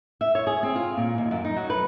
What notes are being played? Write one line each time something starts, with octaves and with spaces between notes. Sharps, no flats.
E5
C#5
G#4
C4
F4
A#2
D#2
F#2
D#4
F#3
B4